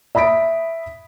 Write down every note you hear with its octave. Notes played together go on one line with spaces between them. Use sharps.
E5 B5 D#6 B6 D7